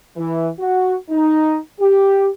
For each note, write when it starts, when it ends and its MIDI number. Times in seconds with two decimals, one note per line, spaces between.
0.17 0.48 52
0.60 0.95 66
1.09 1.57 63
1.80 2.28 67